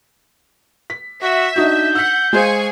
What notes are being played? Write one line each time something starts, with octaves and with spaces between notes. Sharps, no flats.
B6
F#4 E5
D4 D#4 F#4 G6
F#5 E6 B6
G#3 G#4 C5 F5 G#5 C#6